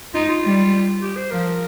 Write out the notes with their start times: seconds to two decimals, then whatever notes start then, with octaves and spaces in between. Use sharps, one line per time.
0.14 D#4 F4
0.29 F4
0.43 G3
1.02 G4
1.17 C5
1.31 F3 A#4